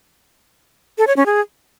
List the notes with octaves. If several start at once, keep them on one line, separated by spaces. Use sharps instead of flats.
A4
C#5
C#4
G#4